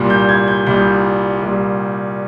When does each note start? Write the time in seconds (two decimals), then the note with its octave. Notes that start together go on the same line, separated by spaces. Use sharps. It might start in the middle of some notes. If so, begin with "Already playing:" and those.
Already playing: C2 A#2 G3
0.10 G6
0.29 G#6
0.48 G6
0.66 C2 A#2 G3 G6
1.42 C2 A#2 G3